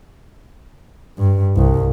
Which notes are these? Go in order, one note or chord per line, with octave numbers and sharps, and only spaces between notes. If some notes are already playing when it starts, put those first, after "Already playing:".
G2
C2